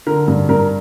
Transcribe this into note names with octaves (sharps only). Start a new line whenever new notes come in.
D3 A#4
G2
G2 A#4